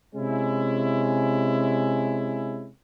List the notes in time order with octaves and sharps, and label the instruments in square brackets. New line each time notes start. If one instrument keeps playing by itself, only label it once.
[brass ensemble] C3 G#3 C#4 E4